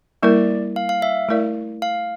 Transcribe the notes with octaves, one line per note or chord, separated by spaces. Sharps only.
G3 A#3 E4 A#4 D5
F5
F5
E5
A3 E4 A#4 D5
F5